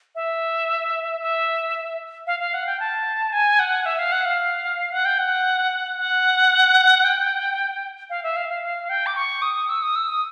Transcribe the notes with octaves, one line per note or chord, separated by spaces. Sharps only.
E5
E5
F5
F5
F#5
G5
A5
G#5
F#5
E5
F5
F#5
F5
F#5
G5
F#5
F#5
G5
F5
E5
F5
F5
F5
G5
D6
C#6
D#6
E6
D#6
E6
D#6